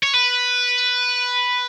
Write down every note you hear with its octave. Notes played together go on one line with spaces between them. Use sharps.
C#5
B4